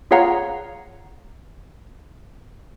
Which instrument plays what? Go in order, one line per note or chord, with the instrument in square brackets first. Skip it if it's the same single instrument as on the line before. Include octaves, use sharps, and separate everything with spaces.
[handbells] F4 G#4 C#5 F5 F#5 A#5